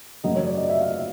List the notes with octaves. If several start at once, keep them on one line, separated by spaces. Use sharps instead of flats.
F#2 C#3 F#3 A3 D#5
C#5
D5
D#5
E5
F5
E5